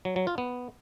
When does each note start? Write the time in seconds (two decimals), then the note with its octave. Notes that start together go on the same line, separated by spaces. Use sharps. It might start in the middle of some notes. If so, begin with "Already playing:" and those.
0.05 F#3
0.16 F#3
0.27 F4
0.38 B3